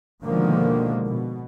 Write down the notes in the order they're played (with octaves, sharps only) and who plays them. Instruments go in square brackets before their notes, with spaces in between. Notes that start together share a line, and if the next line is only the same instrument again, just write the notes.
[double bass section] B2 D3 D#3 F3 G#3 A#3
B2